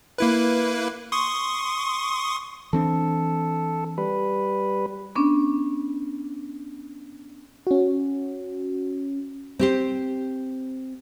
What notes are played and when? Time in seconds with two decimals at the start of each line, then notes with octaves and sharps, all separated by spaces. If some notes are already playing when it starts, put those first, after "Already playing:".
0.18 A#3 E4 B4
1.12 C6 C#6 D#6
2.73 E3 C4 D4 A4
3.98 G3 B4
5.16 B3 C#4 D4
7.67 C#4 F#4
9.59 C4 G4 C5